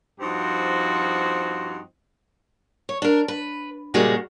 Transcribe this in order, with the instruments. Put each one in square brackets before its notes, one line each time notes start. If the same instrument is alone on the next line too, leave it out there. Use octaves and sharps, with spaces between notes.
[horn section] G2 F3 C4 D#4 F#4
[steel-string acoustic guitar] C#5
D4 A#4
B4
A#2 C#3 G3 G#3 A#3 F#4